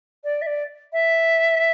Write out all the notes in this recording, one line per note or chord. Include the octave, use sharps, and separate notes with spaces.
D5
E5
D5
E5